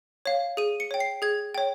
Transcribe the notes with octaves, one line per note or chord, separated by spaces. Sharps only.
C#5 F5
G#4 D#7
C#7
C#5 G5
C7
G#4 G#6
C#5 G5